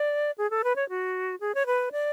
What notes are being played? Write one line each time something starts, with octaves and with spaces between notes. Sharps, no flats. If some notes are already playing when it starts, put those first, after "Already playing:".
Already playing: D5
G#4
A4
B4
C#5
F#4
G#4
C#5
B4
D5